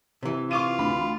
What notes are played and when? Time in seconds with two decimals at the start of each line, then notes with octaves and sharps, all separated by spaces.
0.23 C3 E3
0.51 F4 C#6 D6 D#7
0.78 D2 B5